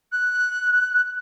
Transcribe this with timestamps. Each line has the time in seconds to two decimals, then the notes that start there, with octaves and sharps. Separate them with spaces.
0.12 F#6